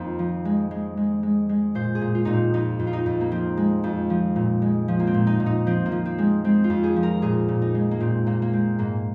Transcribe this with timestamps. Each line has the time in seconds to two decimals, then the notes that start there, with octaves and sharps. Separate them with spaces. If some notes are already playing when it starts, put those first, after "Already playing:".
Already playing: F2 A#3 C4 D#4
0.19 F3
0.45 G#3
0.71 G#3
0.97 G#3
1.23 G#3
1.49 G#3
1.75 A#2 C5
1.95 G#4
2.01 A#2
2.15 F4
2.25 A#2 D#4
2.34 C4
2.54 F2 D#4
2.79 F2
2.87 F4
2.93 D#4
3.06 F2
3.21 A#3
3.31 F3 C4
3.57 G#3
3.84 F2
4.10 F3
4.36 A#2
4.62 G#3
4.88 F3
5.00 A#3
5.07 C4
5.14 A#2
5.27 D#4
5.40 A#2
5.46 D#4
5.66 F3 C4
5.86 A#3
5.92 F3
6.05 C4
6.18 G#3
6.44 G#3 C4
6.64 F4
6.70 F2
6.83 G#4
6.96 F3
7.03 A#4
7.22 A#2 G#4
7.48 A#2
7.62 D#4
7.75 G#3
7.91 A#3
8.00 A#2 C4
8.26 A#2 A#3
8.42 A#3
8.52 G#3 C4
8.79 G#2 A#3